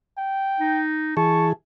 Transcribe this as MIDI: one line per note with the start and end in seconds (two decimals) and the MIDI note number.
0.18 0.82 79
0.60 1.15 63
1.17 1.53 52
1.17 1.53 68
1.17 1.51 81
1.17 1.46 85